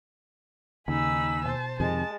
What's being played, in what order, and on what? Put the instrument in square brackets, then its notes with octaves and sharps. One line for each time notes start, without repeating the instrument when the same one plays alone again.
[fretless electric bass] D#2 [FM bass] C#3 [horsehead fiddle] D#4 B5 [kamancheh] G#5 E6
[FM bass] B2 [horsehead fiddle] C5 A5
[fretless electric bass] F2 C3 D#3 [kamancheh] G#3 [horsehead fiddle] A5